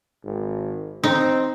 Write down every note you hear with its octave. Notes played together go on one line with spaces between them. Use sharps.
G#1
C4 D#4